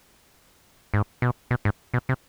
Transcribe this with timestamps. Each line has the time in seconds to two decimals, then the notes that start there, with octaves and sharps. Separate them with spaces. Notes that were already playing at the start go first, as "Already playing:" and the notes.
0.94 G#2
1.22 B2
1.51 B2
1.65 G#2
1.94 B2
2.09 C3